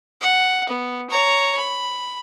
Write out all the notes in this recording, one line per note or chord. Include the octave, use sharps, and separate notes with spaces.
F#5
B3
C#5 A#5
B5